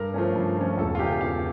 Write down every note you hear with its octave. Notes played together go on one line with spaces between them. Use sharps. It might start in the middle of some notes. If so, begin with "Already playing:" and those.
Already playing: G2 A#4
F3 A3 C#4
G2
F3 A3 C#4
E1 A4
F4
E2 C#3 G4
E1 F5